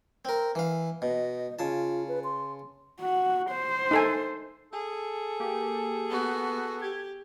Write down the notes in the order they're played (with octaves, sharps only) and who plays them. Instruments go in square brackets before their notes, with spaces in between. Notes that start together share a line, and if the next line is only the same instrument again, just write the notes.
[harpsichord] C4 A#4
E3 F5
[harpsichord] B2 [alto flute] D#5
[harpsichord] C#3 A5 [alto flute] F4
[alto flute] B4
C6
[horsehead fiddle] F#4
C5
[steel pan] D#4 A4 G#5
[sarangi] G#4 [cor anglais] A4
[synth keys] A#3 G4
[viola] B3 F#4
[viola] G4 [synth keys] G#6